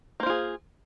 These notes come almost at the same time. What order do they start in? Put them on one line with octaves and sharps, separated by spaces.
A#3 C5 F4 G#4